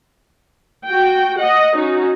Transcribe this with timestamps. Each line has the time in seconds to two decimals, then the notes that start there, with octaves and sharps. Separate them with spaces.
0.86 F#4 G5
1.38 D#5 F#5
1.76 C#4 D#4 F#4